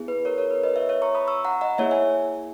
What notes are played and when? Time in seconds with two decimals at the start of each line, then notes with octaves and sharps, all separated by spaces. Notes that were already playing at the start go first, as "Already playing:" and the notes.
Already playing: B3 E4 G#4
0.08 B4
0.25 A#4 C#5
0.38 A#4 C#5
0.51 B4
0.63 B4 D#5
0.76 C#5 E5
0.89 C#5 E5
1.02 A#5 C#6
1.15 B5 D#6
1.28 C#6 E6
1.45 F#5 A#5
1.61 D#5 F#5
1.78 A#3 E4 G#4 C#5 E5
1.91 E5 G#5